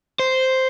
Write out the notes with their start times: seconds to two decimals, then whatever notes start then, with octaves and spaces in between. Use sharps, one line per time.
0.19 C5